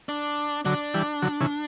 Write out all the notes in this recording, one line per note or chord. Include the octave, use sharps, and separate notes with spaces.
D4
D3 F#3 D4
E3 G3
D3 F#3
C#3 E3